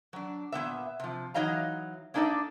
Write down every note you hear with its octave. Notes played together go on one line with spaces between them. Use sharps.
F#3 D4
A#2 G3 B3 E5
C3 F3
E3 F#3 D#4 D#5 F5 A#5
A#3 D4 D#4 A4 D5 E5